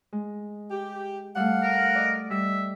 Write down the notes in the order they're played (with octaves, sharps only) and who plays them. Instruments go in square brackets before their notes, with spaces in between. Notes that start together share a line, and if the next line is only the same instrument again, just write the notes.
[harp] G#3
[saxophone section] G4
[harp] G3 A3 [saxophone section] F5 F#5
[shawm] A#4
[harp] D5 D#5
[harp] G3 [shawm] E5